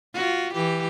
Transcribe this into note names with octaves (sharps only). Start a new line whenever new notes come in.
F4 F#4
E3 G4